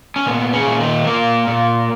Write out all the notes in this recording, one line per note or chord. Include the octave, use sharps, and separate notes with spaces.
C#4
A#2 B3
C#3 C#4
A#2
D#3 D#4
A#2 A#3 A#4
A#2